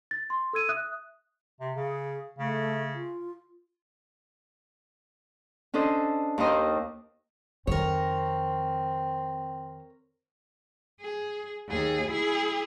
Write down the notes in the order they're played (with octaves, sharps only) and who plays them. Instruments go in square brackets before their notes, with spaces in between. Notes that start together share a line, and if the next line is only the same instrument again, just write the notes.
[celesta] A6
C6
A4 E6 G#6 D#7
E5 D#6 F#6
[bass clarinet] C3
[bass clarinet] C#3 [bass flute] G#4
[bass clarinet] C#3 [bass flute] A3
[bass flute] F4
[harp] C#4 D4 A4 C5 D#5
D#2 D#3 C5 D#5 C6
[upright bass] F2 D#3 [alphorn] C4 [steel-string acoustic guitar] A#4 C#5
[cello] G#4
D#2 G#4
E4 G#4